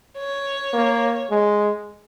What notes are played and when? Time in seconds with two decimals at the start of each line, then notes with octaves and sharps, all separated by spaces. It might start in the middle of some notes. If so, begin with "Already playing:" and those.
0.18 C#5
0.73 A#3
1.30 G#3